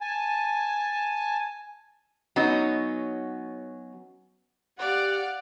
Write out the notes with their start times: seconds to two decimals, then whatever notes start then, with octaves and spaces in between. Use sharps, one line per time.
0.01 G#5 A5
2.36 F#3 B3 C#4 D#4
4.79 G4 D5 F5 F#5